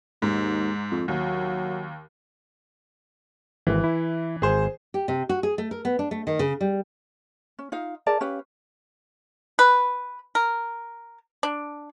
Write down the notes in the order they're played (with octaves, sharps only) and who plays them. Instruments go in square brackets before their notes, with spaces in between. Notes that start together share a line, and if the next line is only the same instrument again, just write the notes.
[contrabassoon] D#2 [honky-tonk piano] G#2
[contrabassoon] F2
[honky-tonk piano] D#2 [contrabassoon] F#3
[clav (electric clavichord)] G#1 [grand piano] E3
[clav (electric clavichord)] E4
[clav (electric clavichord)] G#1 [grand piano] G#4 C5
[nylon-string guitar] G4
C3
F#4
G#4
A3
A#4
B3
D4
A3
D#3
C#3
G3
[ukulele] C#4
D#4 F4 F5
G#4 A#4 D5 A5
C#4 G4 B4 F5
[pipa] B4
A#4
D4